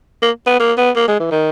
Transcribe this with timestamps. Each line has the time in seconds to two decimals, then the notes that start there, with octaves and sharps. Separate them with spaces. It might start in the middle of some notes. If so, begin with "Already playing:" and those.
0.22 A#3
0.46 B3
0.60 A#3
0.78 B3
0.96 A#3
1.08 G#3
1.20 E3
1.32 D#3